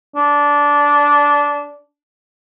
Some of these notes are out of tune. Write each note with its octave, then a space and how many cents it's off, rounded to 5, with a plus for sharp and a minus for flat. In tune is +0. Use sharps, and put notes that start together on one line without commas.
D4 -15